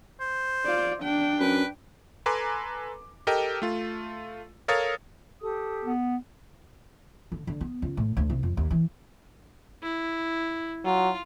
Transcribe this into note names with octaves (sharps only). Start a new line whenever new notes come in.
C5
F4 D5
D4 G5
F#2 B4
A4 B4 G#5 A#5 C6 D6
G4 A4 A#4 D#5 G5
A3 F4
A4 A#4 C#5 F5 D#6 A6
G4 A4 D#6
B3
D3
D3
B3
C#2
A2
D2
C2
F2
D#2
E3
E4
F#3 F4